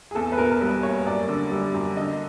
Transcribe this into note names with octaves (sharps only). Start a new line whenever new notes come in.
G#4
E2 A4
B4
B2 A#4
A#4
G3 B4
A#3 C#5
F#2 D5
D3
G3
F#2
D3 D#5